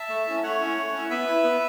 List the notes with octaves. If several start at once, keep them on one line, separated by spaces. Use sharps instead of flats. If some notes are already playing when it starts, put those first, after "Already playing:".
Already playing: E5 A5
A3
C#4 E4
A3 C#5 F#5
C#4 E4
A3
C#4 E4
B3 B4 E5
E4
B3